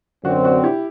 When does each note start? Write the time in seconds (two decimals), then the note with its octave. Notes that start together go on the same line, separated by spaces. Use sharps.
0.24 F#2 D3 F#3 C4 D4 F#4
0.44 D4 F#4
0.63 E4 G4